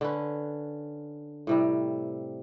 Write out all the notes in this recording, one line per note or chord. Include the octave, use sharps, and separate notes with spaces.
D3 C#4 B4
A2 C3 G3